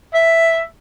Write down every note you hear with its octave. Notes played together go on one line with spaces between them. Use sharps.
E5